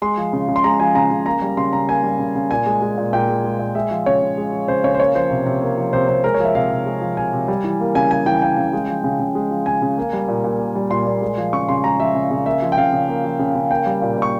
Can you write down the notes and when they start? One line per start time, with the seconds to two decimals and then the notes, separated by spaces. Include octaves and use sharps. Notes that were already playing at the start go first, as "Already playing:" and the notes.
0.02 G#3 C6
0.17 F3
0.33 C#3
0.48 C#3
0.56 C6
0.64 G#3 A#5
0.80 F3 G#5
0.95 C#3 A#5
1.11 C#3
1.26 A#3 A#5
1.42 G3
1.57 C#3 C6
1.73 C#3 A#5
1.88 A#3 G#5
2.04 G3
2.19 C#3
2.35 C#3
2.51 A#2 G#5
2.66 G#3
2.82 G#3
2.98 A#2
3.13 A#2 G5
3.29 G#3
3.44 G#3
3.59 A#2
3.75 G#3 E5
3.91 F3
4.06 C#3 C#5
4.22 C#3
4.37 G#3
4.53 F3
4.68 C#3 C5
4.84 C#3 C#5
4.95 C5
5.00 A#3 C#5
5.15 F3 C5
5.31 C3
5.46 C3
5.62 A#3
5.78 F3
5.93 C3 C5
6.09 C3 C5
6.24 G#3 A#4
6.34 C#5
6.40 F3
6.45 E5
6.55 C3 F5
6.71 C3
6.86 G#3
7.01 F3
7.17 C3 G#5
7.33 C3
7.48 G3
7.64 E3
7.80 A#3
7.95 C#3 G#5
8.11 G3 G#5
8.26 E3 G5
8.42 A#3 G5
8.57 C#3
8.73 G#3
8.88 F3
9.04 C#3
9.19 C#3
9.35 G#3
9.50 F3
9.66 C#3 G#5
9.82 C#3
9.97 A#3
10.13 G3
10.28 A#2
10.44 A#2
10.60 A#3
10.75 G3
10.90 A#2 C6
11.07 A#2
11.22 G#3
11.38 F3
11.53 C#3 C#6
11.69 C#3 C6
11.84 G#3 A#5
12.00 F3 E5
12.15 C#3
12.31 C#3
12.46 A#3 E5
12.62 F3
12.72 G5
12.77 C#3 F5
12.93 C#3
13.08 A#3
13.24 F3
13.39 C#3
13.55 C#3
13.71 A#3 G5
13.86 G3
14.02 A#2
14.18 A#2 C#6